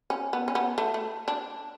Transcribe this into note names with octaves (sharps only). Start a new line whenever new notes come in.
C#4
B3
C#4
B3
A3
A3
D4